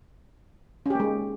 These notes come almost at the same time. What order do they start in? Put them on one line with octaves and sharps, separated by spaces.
C#4 G4 A#3 G#3